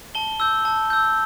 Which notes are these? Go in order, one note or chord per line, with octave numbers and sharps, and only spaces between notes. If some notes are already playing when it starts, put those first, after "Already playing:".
A5 G7
E6 G6
A5
E6 G6